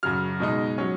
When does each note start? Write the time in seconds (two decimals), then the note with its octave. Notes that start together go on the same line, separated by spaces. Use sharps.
0.03 F#2 C#3 F#3 F6
0.40 B2 G#3 D#4
0.78 F#3 C#4